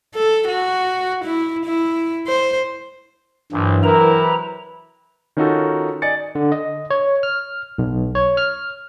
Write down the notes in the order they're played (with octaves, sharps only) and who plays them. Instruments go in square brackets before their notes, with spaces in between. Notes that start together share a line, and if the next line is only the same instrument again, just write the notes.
[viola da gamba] A4
F#4
E4
E4
C5
[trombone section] A#1 [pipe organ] G2 [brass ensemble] E3 F#3
[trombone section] C3 E4 B4 [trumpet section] A#4 [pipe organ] A#5
[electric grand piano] D#3 C#4 D#4 F4 F#4 A4
D5 D#5 G#5 A6 C#7
[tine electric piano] D3
D#5
C#5
F6
B1
C#5
F6